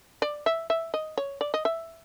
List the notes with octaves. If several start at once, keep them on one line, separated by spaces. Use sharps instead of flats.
D5
E5
E5
D#5
C#5
D5
D#5
E5